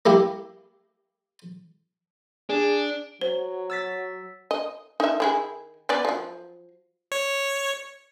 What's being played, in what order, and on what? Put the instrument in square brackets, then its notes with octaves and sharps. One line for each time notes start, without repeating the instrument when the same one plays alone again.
[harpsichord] A#3 E4 G4
[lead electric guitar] D4 [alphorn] G#4
[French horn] F#3 [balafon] C5
[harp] E6 A6 B6
[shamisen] D#5
D#4 E5
D#3 E4 G#4
B3 B4 D5
F3 F#3
[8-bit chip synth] C#5